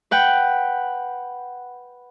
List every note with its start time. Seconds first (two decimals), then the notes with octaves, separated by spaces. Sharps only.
0.11 B4 F#5 G5